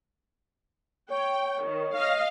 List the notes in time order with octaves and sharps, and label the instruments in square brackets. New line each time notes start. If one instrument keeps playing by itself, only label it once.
[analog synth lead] C#5 [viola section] G5
[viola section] D#3
D#5 F5